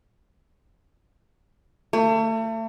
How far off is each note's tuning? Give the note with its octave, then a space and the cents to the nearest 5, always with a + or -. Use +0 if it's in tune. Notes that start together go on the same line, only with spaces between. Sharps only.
A3 +35